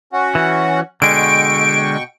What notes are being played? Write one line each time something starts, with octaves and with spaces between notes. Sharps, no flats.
C#4 F#4 F#5
E3
B2 D3 G#3 G5 C#6 D7